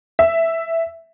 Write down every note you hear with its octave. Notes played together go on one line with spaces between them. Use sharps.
E5